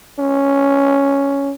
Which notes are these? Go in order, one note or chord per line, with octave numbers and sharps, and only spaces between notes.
C#4